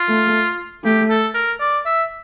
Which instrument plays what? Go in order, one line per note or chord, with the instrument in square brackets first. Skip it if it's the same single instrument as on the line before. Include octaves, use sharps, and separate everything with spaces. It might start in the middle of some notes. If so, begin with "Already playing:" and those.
Already playing: [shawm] F4
[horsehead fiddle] A3
[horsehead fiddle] A3 [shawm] G4
[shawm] A4
A#4
D5
E5